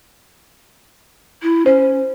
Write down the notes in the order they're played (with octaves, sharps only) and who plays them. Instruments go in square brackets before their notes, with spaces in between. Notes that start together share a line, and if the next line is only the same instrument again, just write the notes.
[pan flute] E4
[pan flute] C#4 [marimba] C5